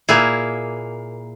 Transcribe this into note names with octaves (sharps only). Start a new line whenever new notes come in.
A#2 A#3 E4 G#4